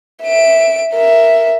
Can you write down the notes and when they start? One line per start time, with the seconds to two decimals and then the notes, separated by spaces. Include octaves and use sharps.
0.23 E5 D7
0.93 A#4 E5